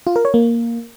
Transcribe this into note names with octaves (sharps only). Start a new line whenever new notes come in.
F4
A#4
C#5
A#3